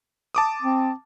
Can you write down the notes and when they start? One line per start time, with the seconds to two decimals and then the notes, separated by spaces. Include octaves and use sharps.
0.35 A5 D6 D#6
0.62 C4